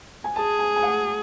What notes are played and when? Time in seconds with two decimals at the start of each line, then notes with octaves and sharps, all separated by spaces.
0.24 G#5
0.36 G#4 A5
0.59 G#5
0.76 G#5
0.83 F#5